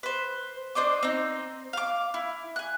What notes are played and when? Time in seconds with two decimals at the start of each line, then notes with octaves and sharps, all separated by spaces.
0.03 B4 C5
0.75 D4 C5 D#5 D6
1.03 C4 D#4
1.73 F5 D6
2.14 E4
2.56 G#5 F#6